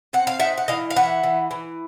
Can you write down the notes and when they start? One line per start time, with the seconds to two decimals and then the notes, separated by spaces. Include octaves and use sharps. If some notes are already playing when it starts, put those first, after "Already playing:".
0.13 C4 F#5
0.27 F5
0.40 D#4 E5 F#5
0.58 F#5
0.68 E3 D#5 F5
0.91 F5
0.96 E3 E5 F#5
1.23 E3
1.51 E3